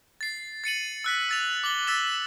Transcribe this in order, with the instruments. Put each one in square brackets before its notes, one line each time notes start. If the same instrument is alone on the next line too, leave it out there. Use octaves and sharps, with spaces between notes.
[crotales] A6 C7
A6 C#7 D#7 F#7
E6 F#6 B6
E6 A6 F7
D6 F#7 G7
E6 A6 B6 E7